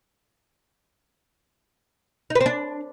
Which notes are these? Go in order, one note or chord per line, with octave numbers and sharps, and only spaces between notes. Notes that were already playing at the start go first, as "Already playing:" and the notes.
D#4
B4
C4
D4